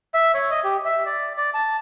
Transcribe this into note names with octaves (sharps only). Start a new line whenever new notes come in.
E5
C#5
D#5
G4
E5
D5
D5
A5